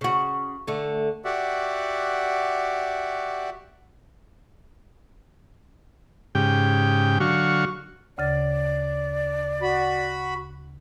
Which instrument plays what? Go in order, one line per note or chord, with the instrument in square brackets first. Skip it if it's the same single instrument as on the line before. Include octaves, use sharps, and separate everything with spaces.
[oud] C#3 F#4
D3 A3
[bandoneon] F#4 G4 D5 E5 F#5
[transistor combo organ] G#2 C#3 G4 G5
D3 F#3 F#4 F5 C#6
[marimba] D2 C#3 A6 [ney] D5
[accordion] F#4 B5